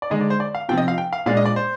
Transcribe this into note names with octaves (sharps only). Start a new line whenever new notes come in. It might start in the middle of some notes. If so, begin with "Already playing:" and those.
D5
D3 G#3 D#4 D#5
D5
C5
D5
F5
C3 F3 C4 G5
D#5
F5
G5
F5
A#2 G#3 D4 F5
D#5
D5
C5